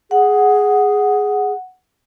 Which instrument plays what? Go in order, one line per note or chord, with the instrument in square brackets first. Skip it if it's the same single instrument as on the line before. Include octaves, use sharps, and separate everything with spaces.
[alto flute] G#4 [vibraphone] F#5